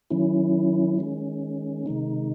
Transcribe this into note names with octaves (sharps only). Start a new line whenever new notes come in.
D#3 F#3 C#4 E4
D#3 G#3 C#4
C3 D#3 G#3 D#4